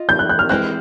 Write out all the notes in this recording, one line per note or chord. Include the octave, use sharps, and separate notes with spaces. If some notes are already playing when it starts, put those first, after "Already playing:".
Already playing: F4 D#5
G6
F#6
F#6
F6
E3 G#3 C4 F#6